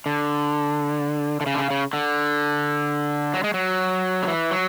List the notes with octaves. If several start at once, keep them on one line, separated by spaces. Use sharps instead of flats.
D3
D3
C#3
D3
C#3
C#3
D3
F#3
G#3
F#3
D3
E3
F#3